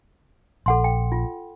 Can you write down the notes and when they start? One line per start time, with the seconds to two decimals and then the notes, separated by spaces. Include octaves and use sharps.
0.66 A#1 A4 F#5 C6
0.84 G5
1.12 F4